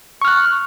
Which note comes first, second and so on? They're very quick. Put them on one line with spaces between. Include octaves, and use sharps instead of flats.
C#6 F6 F#6